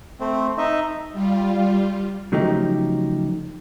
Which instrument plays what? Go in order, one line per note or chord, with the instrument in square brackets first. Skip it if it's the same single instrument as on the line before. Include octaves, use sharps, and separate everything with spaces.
[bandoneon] A3 C4
D#4 D#5 E5
[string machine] G3 F4
[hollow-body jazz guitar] C#3 F3 F#3 A3 D#4 G4